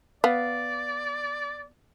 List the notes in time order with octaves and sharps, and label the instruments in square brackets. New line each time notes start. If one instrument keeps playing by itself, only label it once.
[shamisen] B3 [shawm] D5 [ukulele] F5